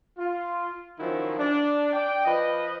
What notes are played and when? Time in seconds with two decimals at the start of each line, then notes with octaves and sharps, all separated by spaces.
0.18 F4
0.99 D#3 F3 F#3 C#4 E4
1.38 D4
1.93 D5 G5
2.25 F3 B4 D#5